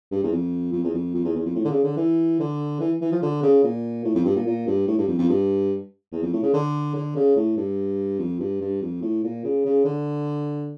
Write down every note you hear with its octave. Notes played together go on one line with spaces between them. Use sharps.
G2
E2
F2
F2
E2
F2
F2
E2
E2
F2
A2
D3
C#3
D3
E3
D3
E3
E3
F3
D3
C#3
A#2
A2
F2
G2
A#2
A#2
G2
A2
G2
F2
F2
G2
E2
F2
A2
C#3
D3
D3
C#3
A2
G2
F2
G2
G2
F2
A2
A#2
C#3
C#3
D3